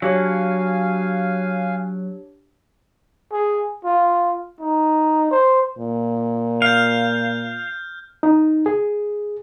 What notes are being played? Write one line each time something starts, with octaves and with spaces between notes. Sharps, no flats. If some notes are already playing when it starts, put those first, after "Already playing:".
F#3 D4 G4 C#5 F5 G#5
G#4
F4
D#4
C5
A#2
F5 F6 G6
D#4
G#4